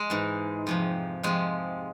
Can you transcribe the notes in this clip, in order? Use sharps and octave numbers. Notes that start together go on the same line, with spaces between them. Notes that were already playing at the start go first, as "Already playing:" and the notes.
Already playing: G#3
G#2 E3
F2 C3 F3
F2 C3 F3 G#3